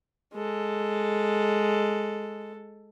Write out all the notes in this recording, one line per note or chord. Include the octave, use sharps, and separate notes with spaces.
G#3 A4